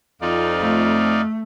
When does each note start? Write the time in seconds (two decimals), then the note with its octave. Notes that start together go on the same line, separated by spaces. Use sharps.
0.21 F2 D#4 F4 D5
0.61 A3